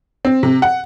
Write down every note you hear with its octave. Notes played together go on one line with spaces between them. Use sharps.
C4
C3
F#5